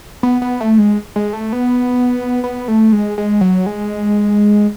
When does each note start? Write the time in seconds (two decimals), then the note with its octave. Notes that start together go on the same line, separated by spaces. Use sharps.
0.23 B3
0.42 B3
0.61 A3
0.78 G#3
1.16 G#3
1.33 A3
1.53 B3
2.44 B3
2.68 A3
2.92 G#3
3.18 G#3
3.41 F#3
3.66 G#3